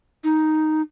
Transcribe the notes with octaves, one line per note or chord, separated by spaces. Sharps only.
D#4